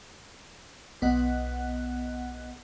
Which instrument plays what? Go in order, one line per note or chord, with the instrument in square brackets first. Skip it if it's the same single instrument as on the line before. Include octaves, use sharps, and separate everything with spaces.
[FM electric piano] B1 B3 D#5 F#5 F#6